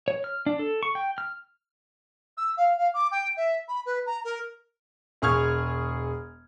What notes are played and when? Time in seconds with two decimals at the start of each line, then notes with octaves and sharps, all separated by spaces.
0.08 C#5
0.24 F6
0.46 D4
0.59 A4
0.83 C#6
0.95 G5
1.18 F6
2.37 E6
2.57 F5
2.77 F5
2.94 D6
3.12 G5
3.37 E5
3.68 B5
3.86 B4
4.06 A#5
4.25 A#4
5.22 E1 G#4 C#6 F6 G#6